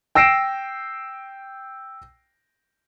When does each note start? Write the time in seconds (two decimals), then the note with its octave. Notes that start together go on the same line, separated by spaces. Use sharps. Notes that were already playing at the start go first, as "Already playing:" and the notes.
0.15 G5 E6 A#6 C7 D7 E7